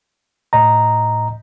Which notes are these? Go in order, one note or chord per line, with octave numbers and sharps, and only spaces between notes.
A2 D#5 A#5